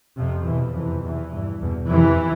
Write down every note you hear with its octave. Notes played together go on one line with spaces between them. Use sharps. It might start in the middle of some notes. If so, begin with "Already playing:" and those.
F2 C3 F3
E2 B2 E3
F2 C3 E3
E2 B2 E3
G2
E2 B2
F2 C3 E3